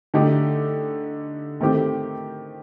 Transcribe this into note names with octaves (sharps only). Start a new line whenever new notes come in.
D3 A3 D#4 G4
D#3 A3 C4 G4